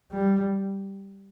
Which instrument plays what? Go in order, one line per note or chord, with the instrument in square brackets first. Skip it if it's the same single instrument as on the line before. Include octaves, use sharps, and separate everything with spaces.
[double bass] G3